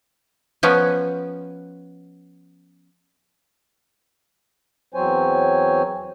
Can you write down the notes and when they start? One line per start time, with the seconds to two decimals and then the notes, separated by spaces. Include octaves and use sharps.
0.63 F3 B3 C#4
4.94 E2 F#3 C4 C5 C#5 G#5